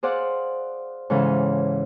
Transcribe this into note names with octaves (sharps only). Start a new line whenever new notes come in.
G#4 C5 D5 F5 F#5
G#2 C#3 E3 A4 F5